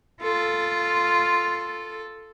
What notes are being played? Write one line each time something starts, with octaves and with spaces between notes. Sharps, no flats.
F4 A4